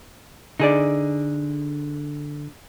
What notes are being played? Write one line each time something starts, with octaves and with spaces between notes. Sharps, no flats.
D3 D#4 G#4 D5